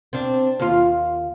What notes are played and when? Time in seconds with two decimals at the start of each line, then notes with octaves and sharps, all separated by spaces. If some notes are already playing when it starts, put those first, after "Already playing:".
0.13 C4 D4
0.59 D#2 F4